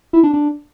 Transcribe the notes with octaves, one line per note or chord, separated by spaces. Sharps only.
E4
D4
D4